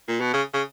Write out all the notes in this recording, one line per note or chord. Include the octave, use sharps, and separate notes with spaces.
A#2
B2
C#3
C#3